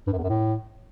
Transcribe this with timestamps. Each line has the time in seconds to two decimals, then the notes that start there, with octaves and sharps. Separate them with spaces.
0.08 G2
0.13 F#2
0.18 E2
0.24 F#2
0.29 A2